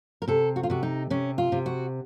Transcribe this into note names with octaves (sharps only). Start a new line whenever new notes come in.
A#4
C3 A4
F#4
F4
C3 F#4
D#4
C3 C#4
F4
C3
F#4